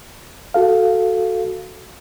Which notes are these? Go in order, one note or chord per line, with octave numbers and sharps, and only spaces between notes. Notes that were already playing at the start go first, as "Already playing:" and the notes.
F#4 A4 F5